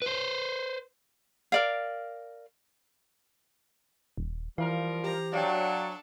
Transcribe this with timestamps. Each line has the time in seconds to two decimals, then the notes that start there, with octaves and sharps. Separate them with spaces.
0.02 B4 C5
1.52 A#4 D5 F5
4.18 D#1
4.58 E3 F3 G3 A#4 F5
5.04 G4 C5 A#5
5.33 F#3 D4 A4 D5 F5 G5